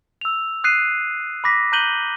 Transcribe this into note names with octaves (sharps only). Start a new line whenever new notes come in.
E6 F7
D#6 F#6 C7 D#7
B5 D6 A#6 B6
A#5 F#6 G6 D#7 F#7 G7